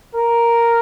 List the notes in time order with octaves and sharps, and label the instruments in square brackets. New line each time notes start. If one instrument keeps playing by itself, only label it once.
[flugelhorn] A#4